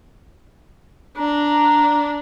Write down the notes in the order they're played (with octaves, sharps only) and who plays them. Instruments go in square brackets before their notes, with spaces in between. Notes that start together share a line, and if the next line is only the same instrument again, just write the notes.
[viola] D4 [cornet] A#5